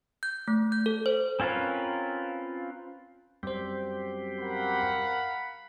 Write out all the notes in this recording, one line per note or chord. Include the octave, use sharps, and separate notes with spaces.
G6
A3
G6
A4
C5
C4 C#4 F4 A#4 B4
F#2 G3 C4 G4 C5
A#4 F5 F#5 B5